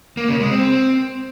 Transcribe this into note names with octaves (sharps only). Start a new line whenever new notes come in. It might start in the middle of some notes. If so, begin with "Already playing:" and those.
A#3
C#3
G#3
C4